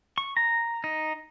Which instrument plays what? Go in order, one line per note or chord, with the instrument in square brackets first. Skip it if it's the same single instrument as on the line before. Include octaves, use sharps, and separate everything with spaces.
[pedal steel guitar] C#6
A#5
D#4